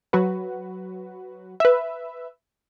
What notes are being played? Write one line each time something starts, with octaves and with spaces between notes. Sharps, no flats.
F#3 F#4 B4
B4 E5